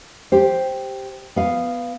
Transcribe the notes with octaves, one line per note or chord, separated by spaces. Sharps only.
G4 C5
B3 F5